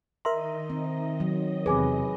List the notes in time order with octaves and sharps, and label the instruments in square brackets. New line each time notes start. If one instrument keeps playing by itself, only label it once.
[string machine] D#3 D#5 [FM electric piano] A#4 E5 A#5 [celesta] C6
[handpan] C4
F#3
[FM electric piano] E2 C3 [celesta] G#4 G#5 D6 [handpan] B4